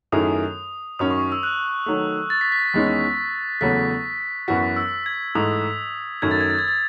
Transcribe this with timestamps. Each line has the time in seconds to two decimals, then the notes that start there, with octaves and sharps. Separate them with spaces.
0.12 F#2 D#3 A3 E4 G#4 D#6
0.99 F#2 D#3 F#3 C#4 D#6
1.11 C#6
1.32 E6
1.43 F#6
1.86 D#3 F#3 A3
2.30 A6
2.41 B6
2.52 B6
2.74 E2 D#3 G#3 C#4
3.61 E2 C#3 F#3 A3 B6
4.48 F#2 E3 B3 F#4 B6
4.76 E6
5.06 G#6
5.35 G#2 E3 A3 D#6
6.22 F#2 D#3 A3 G#6
6.31 A6
6.41 G#6
6.50 A6
6.59 G#6
6.68 A6